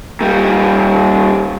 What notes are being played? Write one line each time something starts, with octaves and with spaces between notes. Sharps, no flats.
A#2 G3